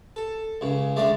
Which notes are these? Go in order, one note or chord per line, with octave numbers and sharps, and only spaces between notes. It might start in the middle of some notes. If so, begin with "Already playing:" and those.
A4
C#2 C#3
D3 G#3 A3 D5